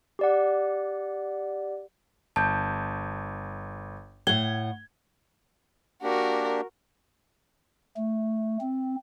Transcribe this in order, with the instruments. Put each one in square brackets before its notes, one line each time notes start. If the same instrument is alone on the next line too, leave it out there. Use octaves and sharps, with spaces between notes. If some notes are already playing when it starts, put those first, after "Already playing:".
[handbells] G4 D5 F#5
[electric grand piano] G1 [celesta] A5 G6
[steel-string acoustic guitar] A2 F#5 [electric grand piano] G#6 [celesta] G7
[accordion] A#3 D4 G4 [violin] F#4 A#4
[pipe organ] A3
C4